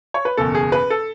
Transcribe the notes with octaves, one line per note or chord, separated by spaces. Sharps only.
C#5
B4
F#1 E2 B2 A4
G#4
B4
A4